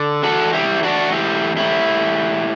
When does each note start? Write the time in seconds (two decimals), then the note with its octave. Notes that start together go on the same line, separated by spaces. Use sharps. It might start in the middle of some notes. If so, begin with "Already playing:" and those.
Already playing: D3
0.23 E2 F#4 A4
0.53 E4 G4
0.67 E2
0.83 D4 F#4
1.12 A2 E4 G4
1.57 A2 E4 G4
2.01 E2